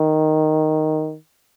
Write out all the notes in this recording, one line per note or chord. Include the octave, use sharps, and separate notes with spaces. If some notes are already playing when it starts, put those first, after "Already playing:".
Already playing: D#3